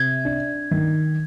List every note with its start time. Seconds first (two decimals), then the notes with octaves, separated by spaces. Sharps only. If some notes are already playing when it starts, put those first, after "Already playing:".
Already playing: C3 G#6
0.25 D4
0.71 D#3